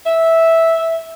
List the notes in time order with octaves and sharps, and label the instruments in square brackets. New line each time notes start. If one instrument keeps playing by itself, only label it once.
[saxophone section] E5